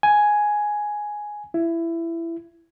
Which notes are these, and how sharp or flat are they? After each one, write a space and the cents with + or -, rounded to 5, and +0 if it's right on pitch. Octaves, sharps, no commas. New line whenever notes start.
G#5 +5
E4 +20